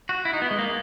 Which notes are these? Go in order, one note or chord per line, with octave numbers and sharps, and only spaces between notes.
F#4
E4
D#4
B3
G#3
A#3